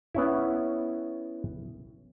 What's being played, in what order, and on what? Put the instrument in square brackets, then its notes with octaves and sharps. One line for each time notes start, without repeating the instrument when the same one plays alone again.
[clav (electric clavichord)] B3 C#4 E4